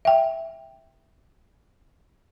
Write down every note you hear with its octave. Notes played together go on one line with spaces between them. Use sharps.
E5 G5